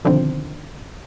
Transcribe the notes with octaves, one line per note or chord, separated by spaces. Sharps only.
B2 D3 D#3 F3 C4